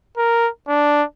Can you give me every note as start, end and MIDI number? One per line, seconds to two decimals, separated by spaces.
0.17 0.49 70
0.68 1.04 62